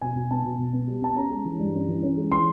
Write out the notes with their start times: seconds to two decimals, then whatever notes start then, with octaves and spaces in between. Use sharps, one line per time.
0.01 B2 G#5
0.16 B2
0.31 B3 A5
0.44 B2
0.59 B2
0.73 B3
0.87 G3
1.02 B3 A5
1.17 C#4 A#5
1.30 G#3
1.45 E3
1.59 G2
1.74 C#4
1.88 E3
2.02 C#4
2.17 G#3
2.32 E3 C6